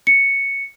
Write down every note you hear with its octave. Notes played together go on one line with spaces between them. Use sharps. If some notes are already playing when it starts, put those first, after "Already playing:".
C#7